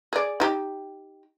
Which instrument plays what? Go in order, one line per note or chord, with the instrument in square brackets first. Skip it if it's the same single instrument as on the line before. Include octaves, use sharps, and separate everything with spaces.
[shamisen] G#4 D5
D#4 G4